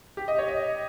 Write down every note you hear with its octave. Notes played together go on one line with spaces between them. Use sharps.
G4
D#5
C#5
D#5